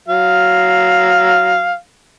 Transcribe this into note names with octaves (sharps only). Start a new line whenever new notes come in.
F#3 F5